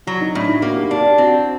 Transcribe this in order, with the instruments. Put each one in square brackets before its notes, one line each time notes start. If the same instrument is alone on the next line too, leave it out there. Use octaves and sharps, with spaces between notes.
[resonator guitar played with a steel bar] F#3 [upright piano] F#4
[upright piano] D#4
[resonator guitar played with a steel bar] A2 [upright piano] D4
[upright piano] D#4
[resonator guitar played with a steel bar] A#3 [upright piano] F#4
[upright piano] G4
[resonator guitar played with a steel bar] D4 [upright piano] G4
[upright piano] G4
[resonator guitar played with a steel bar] C4 [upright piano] F#4